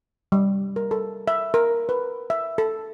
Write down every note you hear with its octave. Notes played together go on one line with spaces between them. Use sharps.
G3
A#4
A4
E5
A#4
B4
E5
A4